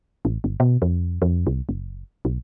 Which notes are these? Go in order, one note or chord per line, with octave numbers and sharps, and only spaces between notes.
A1
G1
B2
F2
F2
C2
F#1
B1